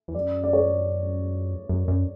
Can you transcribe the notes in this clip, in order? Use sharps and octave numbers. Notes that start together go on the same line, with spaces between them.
E2
F#2 D5
D5
C#5
F#2
F#2